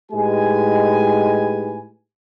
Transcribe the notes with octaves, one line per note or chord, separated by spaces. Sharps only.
A2 G#3 D#4 G4 B4 G#5